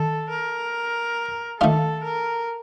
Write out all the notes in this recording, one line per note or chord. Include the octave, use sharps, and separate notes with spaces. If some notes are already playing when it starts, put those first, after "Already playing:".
Already playing: D#3 A4
A#4
D#3 A3 D4 F4 A4
A#4